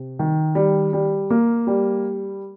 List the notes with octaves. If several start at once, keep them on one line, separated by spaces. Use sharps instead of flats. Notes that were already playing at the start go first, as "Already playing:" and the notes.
Already playing: C3
D#3
G3
G3
A#3
G3